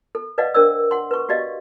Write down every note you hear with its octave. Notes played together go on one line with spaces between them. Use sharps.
A4
B4 D5 D#5 F5 F#5
D4 A#4 C5 D5 E6
F#5 C6
B4 C#6
F#4 G4 D5 D#5 F5